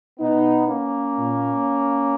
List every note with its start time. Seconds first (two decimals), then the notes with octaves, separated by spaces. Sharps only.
0.20 B2 B3 D#4
0.68 A#3 C#4
1.15 A#2